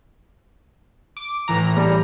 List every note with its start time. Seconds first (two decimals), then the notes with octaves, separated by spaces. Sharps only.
1.17 D6
1.48 A2 E3 A#5
1.77 G3